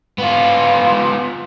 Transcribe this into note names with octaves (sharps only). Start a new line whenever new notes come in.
B3 F4